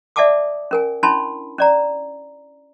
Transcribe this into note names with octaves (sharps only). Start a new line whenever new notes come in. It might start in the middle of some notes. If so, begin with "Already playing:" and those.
D5 E5 F#5 A5 D6 D#6
C#4 A#4 G#5
C#4 D4 E4 A5 B5 C6
C#4 D5 A#5